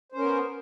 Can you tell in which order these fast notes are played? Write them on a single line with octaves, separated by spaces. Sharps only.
C5 C#4 A#4 B3